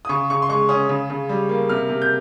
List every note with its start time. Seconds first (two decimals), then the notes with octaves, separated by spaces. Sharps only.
0.05 D#6
0.09 C#3 C#6
0.30 C#3 C#6
0.42 C6
0.49 G#3 C#6
0.69 C#4 D#6
0.89 C#3
1.10 C#3
1.29 G3
1.49 A#3
1.69 C3 F6
1.89 C3
2.02 G6